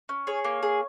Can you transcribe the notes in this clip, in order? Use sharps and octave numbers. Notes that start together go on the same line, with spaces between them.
C#4
G#4 C#5
A#3
G#4